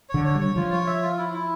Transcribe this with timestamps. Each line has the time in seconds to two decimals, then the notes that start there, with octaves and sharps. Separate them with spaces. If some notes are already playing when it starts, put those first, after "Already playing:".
0.09 D3 C#5
0.25 C#5
0.35 G3
0.40 C#5
0.56 F3 F4
0.72 C#5
0.87 E5
1.02 F4
1.18 E4
1.34 E4